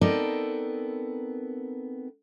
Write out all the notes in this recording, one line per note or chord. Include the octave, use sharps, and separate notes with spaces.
B3 C4 D#4 A4 A#4 D5